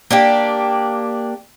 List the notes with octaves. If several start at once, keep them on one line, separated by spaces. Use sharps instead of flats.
A#3 D4 G4